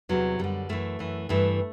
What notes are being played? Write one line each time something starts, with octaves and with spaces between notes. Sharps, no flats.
E2 C3 E3 F#3
F#2 D3 G3
F#2 E3 A3
F#2 E3
G2 E3 A3